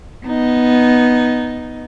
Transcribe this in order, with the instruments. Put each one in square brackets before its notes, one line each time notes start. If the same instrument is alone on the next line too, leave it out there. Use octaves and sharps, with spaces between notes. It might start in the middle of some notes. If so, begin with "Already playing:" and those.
[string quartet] B3 D#4